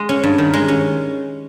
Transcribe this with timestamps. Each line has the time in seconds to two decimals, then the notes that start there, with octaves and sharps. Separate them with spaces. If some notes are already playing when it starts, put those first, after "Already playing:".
Already playing: G#3
0.09 C#4
0.23 G2
0.38 D#3
0.54 G#3
0.68 C#4